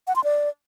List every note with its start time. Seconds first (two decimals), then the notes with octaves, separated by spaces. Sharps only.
0.07 F#5
0.16 C6
0.24 D5